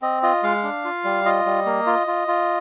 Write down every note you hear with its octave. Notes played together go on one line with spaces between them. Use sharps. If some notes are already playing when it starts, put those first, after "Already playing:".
C4 D#5
F4 D#5
G#3 F5
D4
F4
G3
F4 D#5
G3
A#3
F4
F4
F4